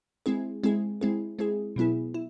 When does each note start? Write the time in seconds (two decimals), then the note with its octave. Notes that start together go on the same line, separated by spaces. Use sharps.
0.26 G#3 C4 E4 G#4
0.63 G#3 C4 E4 G#4
1.01 G#3 C4 E4 G#4
1.39 G#3 C4 E4 G#4
1.76 B2 F#3 B3 E4 G#4
2.14 E4